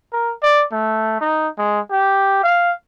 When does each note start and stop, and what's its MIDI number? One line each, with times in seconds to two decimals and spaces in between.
0.13 0.33 70
0.42 0.64 74
0.72 1.19 57
1.21 1.48 63
1.58 1.80 56
1.91 2.40 67
2.44 2.73 77